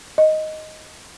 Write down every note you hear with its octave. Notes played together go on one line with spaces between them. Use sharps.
D#5